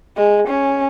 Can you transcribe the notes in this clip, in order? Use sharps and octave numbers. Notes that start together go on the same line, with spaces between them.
G#3
C#4